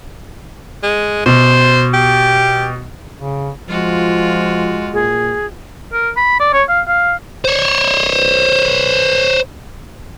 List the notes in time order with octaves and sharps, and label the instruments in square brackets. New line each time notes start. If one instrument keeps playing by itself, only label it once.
[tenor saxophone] G#3
[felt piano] B2 [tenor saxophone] C5
[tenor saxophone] G4
[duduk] C#3
[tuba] F3 [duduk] G#3 [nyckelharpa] F4 F#4
[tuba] A#2 [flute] G#4
[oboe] A#4
B5
D5
C#5
F5
F5
[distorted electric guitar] C5 C#5